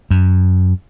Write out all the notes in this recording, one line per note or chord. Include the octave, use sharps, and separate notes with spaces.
F#2